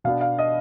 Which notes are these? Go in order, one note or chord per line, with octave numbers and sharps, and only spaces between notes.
B2 B3 D4 F5
F5
D#5